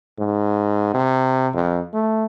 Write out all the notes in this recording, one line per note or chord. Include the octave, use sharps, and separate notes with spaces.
G#2
C3
F2
A3